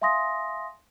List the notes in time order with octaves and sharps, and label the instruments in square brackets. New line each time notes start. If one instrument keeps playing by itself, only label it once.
[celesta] E5 F5 G#5 C6 D#6 A#6